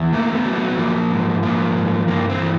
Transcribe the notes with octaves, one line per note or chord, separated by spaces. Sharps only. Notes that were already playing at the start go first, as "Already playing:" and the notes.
Already playing: E2
A3 A#3
B3
F#3
B3
B3
F3 A#3
G#2
F3 A#3
G#2
G2 A#3
C4
E3